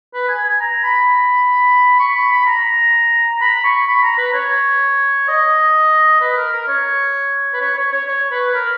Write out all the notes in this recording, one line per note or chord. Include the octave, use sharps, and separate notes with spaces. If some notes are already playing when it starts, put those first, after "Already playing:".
B4
G#5
G#5
A#5
B5
C#6
B5
B5
A#5
B5
C#6
B5
A#5
B4
C#5
D#5
B4
A#4
A#4
C#5
B4
C#5
C#5
C#5
C#5
B4
A#4